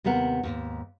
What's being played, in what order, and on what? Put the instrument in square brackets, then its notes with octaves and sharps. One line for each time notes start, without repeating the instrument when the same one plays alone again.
[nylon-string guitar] D#2 C3 B3 A#4 F#5
D#2 G#2